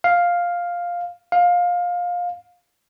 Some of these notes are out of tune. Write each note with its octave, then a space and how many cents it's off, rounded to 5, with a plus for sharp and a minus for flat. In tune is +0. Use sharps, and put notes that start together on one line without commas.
F5 +5
F5 +20